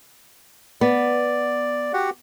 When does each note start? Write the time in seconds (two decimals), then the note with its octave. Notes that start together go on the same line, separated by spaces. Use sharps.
0.81 B3 D5
1.93 F#4 G4 F#5